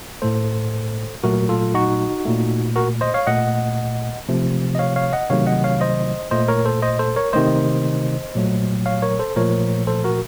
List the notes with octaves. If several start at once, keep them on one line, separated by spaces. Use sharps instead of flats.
A2 A3 A4 C5
A#2 F#3 A3 F#4 A#4
F4 A4
D#4 F#4
A#2 A3
F#4 A#4
C5 D#5
C#5 F5
A#2 A3 D#5 F#5
C3 F3 A3
D#5
C#5 F5
C#5 F5
D#5 F#5
C3 D#3 F#3 A3 C#5 F5
D#5 F#5
C#5 F5
C5 D#5
A#2 A3 C5 D#5
A#4 C#5
A4 C5
C5 D#5
A4 C5
A#4 C#5
C3 D#3 A3 C5 D#5
A#2 F#3 A3
C#5 F5
A#4 C#5
A4 C5
A#2 F3 A3 A#4 C#5
A4 C5
F#4 A#4